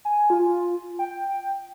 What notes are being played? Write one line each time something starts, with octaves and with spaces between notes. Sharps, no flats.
G#5
F4
G5